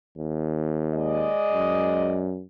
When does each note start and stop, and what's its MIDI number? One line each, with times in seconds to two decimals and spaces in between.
0.18 1.30 39
0.94 2.33 56
0.94 2.33 74
0.94 2.33 75
1.53 2.43 42